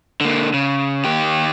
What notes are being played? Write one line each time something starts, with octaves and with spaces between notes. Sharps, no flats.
D3 A#3
C#3
D#2 G4